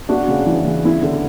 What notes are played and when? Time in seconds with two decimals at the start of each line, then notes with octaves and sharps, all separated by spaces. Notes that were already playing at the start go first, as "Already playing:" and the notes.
0.09 B3 D4 F#4
0.28 C#3
0.46 E3
0.65 C#3
0.84 B3 E4
1.03 D3